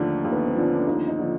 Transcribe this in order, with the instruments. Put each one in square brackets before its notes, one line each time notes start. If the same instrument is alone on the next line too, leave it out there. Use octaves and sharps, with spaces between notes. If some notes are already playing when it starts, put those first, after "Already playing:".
Already playing: [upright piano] D#2 D3 F3 [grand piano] A3
[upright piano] D#2
[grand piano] B3
C4
[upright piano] D3 F3 [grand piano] C#4
[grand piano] D4
[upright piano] D#2 [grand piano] D#4
[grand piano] D#4
[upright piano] D3 F3